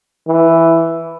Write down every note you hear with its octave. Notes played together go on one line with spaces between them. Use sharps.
E3